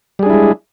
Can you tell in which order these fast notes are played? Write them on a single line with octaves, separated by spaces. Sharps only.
G3 G#4 D4 E4 G#3